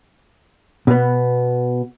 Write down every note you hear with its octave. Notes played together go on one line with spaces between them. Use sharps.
B2 B3